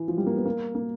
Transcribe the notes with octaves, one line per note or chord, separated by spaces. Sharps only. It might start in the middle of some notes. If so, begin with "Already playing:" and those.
Already playing: E3
F3
G3
A#3
B3
A#3
A#3